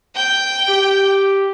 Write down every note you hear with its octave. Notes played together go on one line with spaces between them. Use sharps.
G5 G6
G4